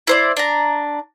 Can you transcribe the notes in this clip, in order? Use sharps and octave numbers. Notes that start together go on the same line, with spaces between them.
E4 C5 D5
D4 A#5